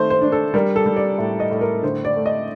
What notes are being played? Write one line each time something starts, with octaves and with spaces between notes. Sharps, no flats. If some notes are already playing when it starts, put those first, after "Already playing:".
Already playing: D#3 A3 C5
C5
D4
A4
G3 A#4
A4
G3
D5
A2
D#5
A2
A#4
D3 C5
D5
A3
D#5